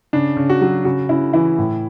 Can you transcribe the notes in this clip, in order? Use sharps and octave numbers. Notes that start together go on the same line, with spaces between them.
C#3 D4
C#3
F#4
F#3
C#3 F#4
C#3 E4
E3 E4
A2